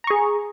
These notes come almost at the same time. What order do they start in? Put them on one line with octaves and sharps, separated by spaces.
A#5 C#6 G#4